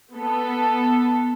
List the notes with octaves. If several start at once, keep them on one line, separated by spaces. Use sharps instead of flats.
B3 A4